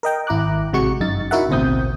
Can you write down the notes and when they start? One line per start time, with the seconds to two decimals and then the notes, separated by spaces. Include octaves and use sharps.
0.03 A#4 D#5 G5
0.27 G#1 E4 A#5 D6 F#6
0.73 A1 C3 G#3 F#4 C#6 C#7
1.00 G1 F#2 D#4 A6
1.31 D#4 E4 F#4 A#4 E5 F#5
1.49 A1 D2 B2 C4 D#6 G6